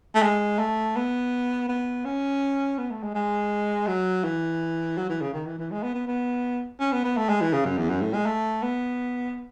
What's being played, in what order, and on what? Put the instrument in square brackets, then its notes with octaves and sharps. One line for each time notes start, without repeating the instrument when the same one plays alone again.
[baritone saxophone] A3
G#3
A3
B3
B3
C#4
B3
A3
G#3
G#3
F#3
E3
F#3
E3
C#3
D#3
E3
E3
G#3
B3
B3
B3
C#4
B3
B3
A3
G#3
E3
C#3
F#2
E2
F#2
A2
G#3
A3
B3